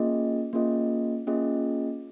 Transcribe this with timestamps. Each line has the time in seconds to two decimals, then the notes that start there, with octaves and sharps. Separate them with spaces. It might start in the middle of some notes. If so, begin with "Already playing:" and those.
Already playing: A#3 C#4 F4 G#4 D#5
0.53 A#3 C#4 F4 G#4 D#5
1.27 A#3 C#4 F4 G#4 D#5